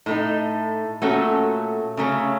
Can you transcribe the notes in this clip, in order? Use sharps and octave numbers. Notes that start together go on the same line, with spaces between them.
A2 A3 D#4
A#2 A3 C#4 F#4 A4
C#3 F#3 A3 C#4